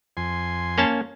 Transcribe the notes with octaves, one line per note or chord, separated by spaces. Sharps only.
F2 G#5 C6
A#3 C#4 A5